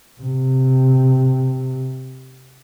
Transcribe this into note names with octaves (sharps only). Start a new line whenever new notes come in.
C3